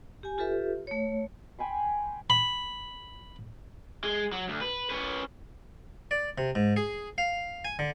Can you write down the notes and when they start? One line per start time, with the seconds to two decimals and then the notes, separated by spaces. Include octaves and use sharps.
0.23 G4 G#5
0.38 F4 G4 A4 B4 E5
0.87 A3 C#5
1.59 G5 G#5 B5 C6
2.30 B5
4.04 G#3
4.32 F#3
4.49 D2
4.61 B4
4.90 C#4 B4
6.11 D5
6.38 C3
6.55 G#2
6.76 G#4
7.18 F5
7.65 G#5
7.79 D3